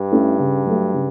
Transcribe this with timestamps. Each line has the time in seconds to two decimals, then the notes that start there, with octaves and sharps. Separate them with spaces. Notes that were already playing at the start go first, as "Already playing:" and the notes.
Already playing: G2
0.12 A3 C#4 E4
0.39 C#3
0.66 F#3 A3
0.94 C#3